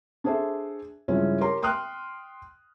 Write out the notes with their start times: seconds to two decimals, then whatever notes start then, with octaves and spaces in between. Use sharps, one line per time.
0.24 D4 G#4 A4 C5 E5
1.08 G2 C#3 F3 G#3 C#4 E4
1.41 G4 A#4 C#5 A#5 C6
1.62 G5 C6 D#6 F6 F#6